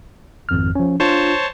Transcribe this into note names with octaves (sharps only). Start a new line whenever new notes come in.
G#1 F2 F6
F3 C#4
D4 F4 C5 C#5 A5